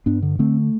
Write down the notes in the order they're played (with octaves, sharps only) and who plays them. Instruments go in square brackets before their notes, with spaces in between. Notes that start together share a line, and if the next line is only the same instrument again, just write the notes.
[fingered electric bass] G2 B3 D4
D3
D3 A3 C4